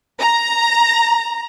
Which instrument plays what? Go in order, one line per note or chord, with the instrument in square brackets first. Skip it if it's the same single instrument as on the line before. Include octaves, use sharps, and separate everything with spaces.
[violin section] A#5